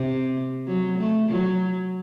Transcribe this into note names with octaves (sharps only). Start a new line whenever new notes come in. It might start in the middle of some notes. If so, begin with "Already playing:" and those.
Already playing: C3
F#3
A3
F#3